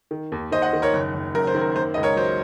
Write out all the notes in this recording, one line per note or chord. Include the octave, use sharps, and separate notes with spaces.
D#3
D#2
D#2 C5 D#5
D#5 F#5
D#3
A#4 C#5
F#1
F#1
F#2 A#4
C5
D#3
A#4
A#3 C5
C#2 D#5
A#4 C#5
F#3 C5